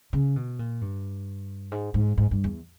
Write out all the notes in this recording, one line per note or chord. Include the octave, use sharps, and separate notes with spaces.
C#3
B2
A#2
G2
G#2
G#2
G#2
G2
E2